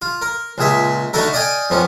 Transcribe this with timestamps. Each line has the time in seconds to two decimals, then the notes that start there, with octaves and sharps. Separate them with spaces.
0.02 F4
0.22 A#4
0.58 C#2 A#2 G#4 E5
1.13 D3 A3 D#4 F#4 A4 A#4
1.33 D5 D#5 F5 G5 G#5
1.70 F2 F3 B3 C#4